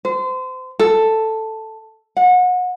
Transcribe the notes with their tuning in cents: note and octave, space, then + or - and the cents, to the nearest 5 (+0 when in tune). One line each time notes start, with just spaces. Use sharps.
C5 -30
A4 +5
F#5 -30